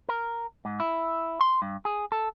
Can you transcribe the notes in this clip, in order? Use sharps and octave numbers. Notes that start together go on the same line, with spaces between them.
A#4
G#2
E4
C6
G2
G#4
A4